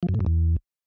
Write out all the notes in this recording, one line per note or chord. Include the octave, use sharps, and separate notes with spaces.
F3
F#2
A2
F#2
E2